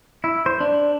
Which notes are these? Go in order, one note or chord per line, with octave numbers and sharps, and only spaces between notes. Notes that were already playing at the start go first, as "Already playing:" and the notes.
E4
C5
D4